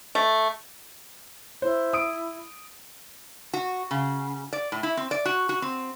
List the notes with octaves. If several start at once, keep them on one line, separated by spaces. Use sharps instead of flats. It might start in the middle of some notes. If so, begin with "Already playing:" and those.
A3
E4 C5
D#6 D7
F#4
C#3
D5
A2
E4
C4
D5
F#4
F#4
C4